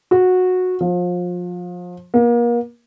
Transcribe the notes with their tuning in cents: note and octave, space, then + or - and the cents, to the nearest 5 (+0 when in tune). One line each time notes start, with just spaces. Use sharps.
F#4 -15
F3 +30
A#3 +35